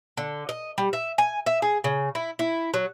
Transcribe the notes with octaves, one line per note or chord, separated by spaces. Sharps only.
D3
D#5
G3
E5
G#5
E5
G#4
C#3
E4
E4
F#3